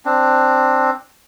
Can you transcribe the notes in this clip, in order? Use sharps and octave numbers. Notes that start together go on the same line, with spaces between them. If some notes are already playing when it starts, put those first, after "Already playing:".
C4 D4